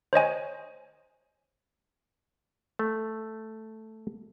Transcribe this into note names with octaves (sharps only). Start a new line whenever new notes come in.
C5 C#5 D#5 G#5
A3